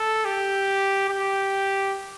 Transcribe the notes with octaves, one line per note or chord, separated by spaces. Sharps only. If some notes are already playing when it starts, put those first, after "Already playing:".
Already playing: A4
G4
G4